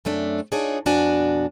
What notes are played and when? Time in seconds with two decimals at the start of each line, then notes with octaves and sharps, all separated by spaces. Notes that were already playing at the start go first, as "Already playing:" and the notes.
0.05 F#2 C3 A3 D4
0.52 D4 D#4 F4 G#4 C#5
0.86 F2 B2 D4 F#4 G#5